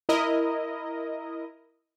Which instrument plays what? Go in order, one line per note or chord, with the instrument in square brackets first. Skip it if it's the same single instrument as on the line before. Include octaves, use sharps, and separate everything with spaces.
[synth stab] E4 A#4 D#5